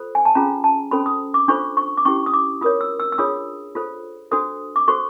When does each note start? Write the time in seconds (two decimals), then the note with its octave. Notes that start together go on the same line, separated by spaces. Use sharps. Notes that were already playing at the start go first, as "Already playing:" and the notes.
Already playing: F4 A4 C5
0.15 G#5
0.25 A5
0.35 C#4 F4 G#4 A#5
0.64 A5
0.91 C#4 F#4 A4 C5 B5
1.06 D#6
1.34 D6
1.48 D4 F4 A4 C5 C#6
1.77 C#6
1.97 D6
2.05 C#4 E4 G4 C#6
2.26 D#6
2.33 D6
2.61 F4 A#4 C#5 D#6
2.81 E6
3.00 E6
3.12 E6
3.18 D4 F4 G#4 C#5 D#6
3.75 F4 A4 C5
4.31 D4 F#4 A4 C5 D#6
4.76 D6
4.88 F#4 A4 C5 C#6